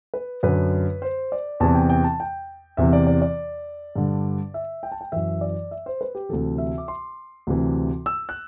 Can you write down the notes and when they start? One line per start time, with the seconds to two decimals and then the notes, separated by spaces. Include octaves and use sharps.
0.14 B4
0.43 F#2 D3 B4
1.02 C5
1.32 D5
1.60 E2 C3 E3 A5
1.75 G5
1.90 G5
2.04 A5
2.20 G5
2.77 E2 C3 E3 E5
2.93 D5
3.07 D5
3.22 D5
3.96 G2 D3
4.54 E5
4.83 G5
4.92 A5
5.01 G5
5.12 F#2 E3 E5
5.41 D5
5.71 E5
5.86 C5
6.01 B4
6.15 G4
6.29 D2 C3 E3 A4
6.58 E5
6.78 D6
6.88 C6
7.47 D2 C3 E3
8.06 E6
8.29 F#6